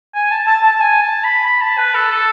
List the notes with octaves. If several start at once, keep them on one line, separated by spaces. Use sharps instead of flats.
G#5
A5
A5
A5
G#5
A5
B5
B5
A5
B4
A4
A4